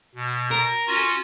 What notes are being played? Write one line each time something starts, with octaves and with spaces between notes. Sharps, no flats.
B2
A#4
C#4 F4 F#4